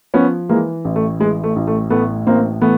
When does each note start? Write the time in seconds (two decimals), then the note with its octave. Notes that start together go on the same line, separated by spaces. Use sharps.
0.14 F3 B3 C#4
0.49 E3 G#3 A#3
0.85 A1
0.96 A3
1.19 E3 G#3
1.43 A3
1.56 A1
1.67 A3
1.90 A2 A3 B3
2.26 A1 A#3 C4
2.61 E3 A3 B3